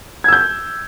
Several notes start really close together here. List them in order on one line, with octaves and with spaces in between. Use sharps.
G#6 E6 G6